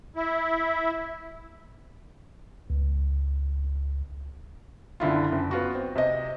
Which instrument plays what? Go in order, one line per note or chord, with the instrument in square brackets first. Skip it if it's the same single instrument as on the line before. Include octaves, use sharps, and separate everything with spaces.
[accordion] E4
[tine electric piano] C#2
[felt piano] F#1 D3 E4 F4
F#1
B3 F4 F#4
C4
C3 D#5